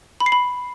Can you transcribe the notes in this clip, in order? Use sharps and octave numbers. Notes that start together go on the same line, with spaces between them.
B5
C7
B5